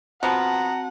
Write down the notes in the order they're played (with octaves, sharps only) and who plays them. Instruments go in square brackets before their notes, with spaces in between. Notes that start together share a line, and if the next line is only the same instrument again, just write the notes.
[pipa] F3 B3 [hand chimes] C4 F#4 A5 [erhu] F#5 [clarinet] A#5